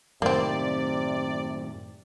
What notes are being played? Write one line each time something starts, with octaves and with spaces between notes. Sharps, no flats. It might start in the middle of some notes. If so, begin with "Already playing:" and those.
F#2 A2 C3 D#3 A#3 C4 D5